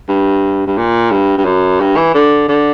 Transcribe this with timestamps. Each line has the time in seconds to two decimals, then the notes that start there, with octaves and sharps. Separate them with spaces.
0.08 G2
0.67 G2
0.78 A#2
1.11 G2
1.38 G2
1.45 F#2
1.81 G2
1.97 E3
2.14 D3
2.48 D3